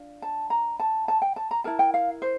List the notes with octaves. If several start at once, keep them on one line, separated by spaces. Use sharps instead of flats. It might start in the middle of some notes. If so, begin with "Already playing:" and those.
Already playing: D4 F4
A5
A#5
A5
A5
G5
A5
A#5
E4 A#4 A5
G5
F5
C5